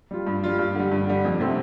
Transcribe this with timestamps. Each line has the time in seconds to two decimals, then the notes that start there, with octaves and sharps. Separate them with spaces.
0.11 G3 F4
0.27 G2
0.44 G3 F4
0.59 G2
0.75 D3 G3
0.92 G2
1.07 D3 G3
1.25 F2
1.40 C3 A3 C4